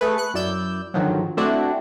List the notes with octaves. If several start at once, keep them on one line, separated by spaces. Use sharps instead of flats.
A3 G#4 B4
F#6 C#7
F#2 E4 D5 E6 G6
G#2 D3 D#3 F3 F#3
A3 C4 D4 E4 F#4